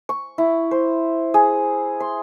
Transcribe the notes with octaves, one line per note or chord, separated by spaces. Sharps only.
C#6
E4
C5
G#4
C6